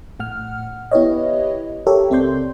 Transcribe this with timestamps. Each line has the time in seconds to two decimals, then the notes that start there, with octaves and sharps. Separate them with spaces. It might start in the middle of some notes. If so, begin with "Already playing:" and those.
0.19 A#1 A2 F#5 F6
0.91 B3 E4 G4 B4 C#5 D#5
1.87 G4 A4 A#4 C#5 E5
2.10 C#2 C4 A4 D5 C6 G6